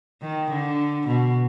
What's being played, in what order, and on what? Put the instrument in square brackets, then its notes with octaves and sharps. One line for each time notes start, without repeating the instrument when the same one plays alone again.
[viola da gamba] D#3
D3
B2